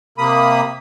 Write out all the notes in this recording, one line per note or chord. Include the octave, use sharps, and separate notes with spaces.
C3 A#3 B5 D#6